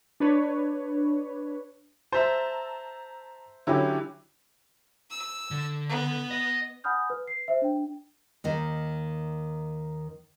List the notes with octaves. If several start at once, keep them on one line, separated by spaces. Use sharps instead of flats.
D4 B4 C#5
C5 E5 A5 A#5 E6
D3 F#3 C#4 E4 G4
E6
D3
B3
D#5
F#5 G#5 B5 D#6 F6 G6
B4
C7
C5 E5
D4 G5
D#2 D#3 D#4